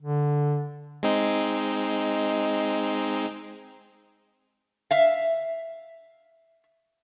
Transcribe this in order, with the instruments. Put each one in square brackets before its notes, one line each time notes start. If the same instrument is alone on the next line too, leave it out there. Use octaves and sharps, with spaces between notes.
[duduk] D3
[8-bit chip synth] G#3 C4 D#4
[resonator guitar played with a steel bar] E5 F5